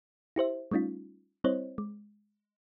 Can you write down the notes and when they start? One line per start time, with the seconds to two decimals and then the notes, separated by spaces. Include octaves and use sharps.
0.36 E4 G4 C5 E5
0.71 G3 A3 C#4 D#4 F4
1.44 G3 C4 E4 C5 C#5 D#5
1.78 G#3